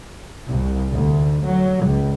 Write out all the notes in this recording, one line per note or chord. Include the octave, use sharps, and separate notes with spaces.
C2
D2
F#3
C#2